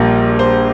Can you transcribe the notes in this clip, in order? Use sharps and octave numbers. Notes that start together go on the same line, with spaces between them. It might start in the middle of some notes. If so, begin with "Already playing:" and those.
Already playing: A#1 A#2 G3 A#3
C5